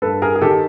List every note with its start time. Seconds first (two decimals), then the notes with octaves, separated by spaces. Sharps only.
0.02 G2 A4 B4
0.22 G#4 A#4
0.36 G#4
0.41 D#3 G4 A4